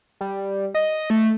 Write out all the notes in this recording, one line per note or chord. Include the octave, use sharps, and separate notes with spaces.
G3
D#5
A3